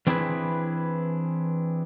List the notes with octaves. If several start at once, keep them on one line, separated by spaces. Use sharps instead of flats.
E3 C4 D4 E4 G#4 B4